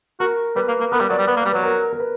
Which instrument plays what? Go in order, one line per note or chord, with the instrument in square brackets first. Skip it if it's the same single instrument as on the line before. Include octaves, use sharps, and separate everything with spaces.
[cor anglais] F#4 [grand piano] A#4
[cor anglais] G3 [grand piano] B4
[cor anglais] A#3
A#3
[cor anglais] B3 [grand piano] A#4
[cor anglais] G3 [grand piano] B4
[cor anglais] F#3 [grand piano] D5
[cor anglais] G3
[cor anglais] B3 [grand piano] B4
[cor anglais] A#3
[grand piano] B4
[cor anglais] G3
[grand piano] B4
[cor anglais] F#3
[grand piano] A#4
A#4
B4